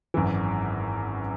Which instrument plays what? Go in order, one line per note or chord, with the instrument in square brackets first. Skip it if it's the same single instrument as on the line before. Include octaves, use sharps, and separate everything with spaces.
[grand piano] G#1 F#2 E3